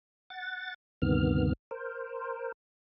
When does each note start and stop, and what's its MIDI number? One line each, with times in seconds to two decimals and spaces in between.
0.30 0.74 78
0.30 0.74 93
1.02 1.53 38
1.02 1.53 43
1.02 1.53 48
1.02 1.53 51
1.02 1.53 59
1.02 1.53 89
1.71 2.52 70
1.71 2.52 72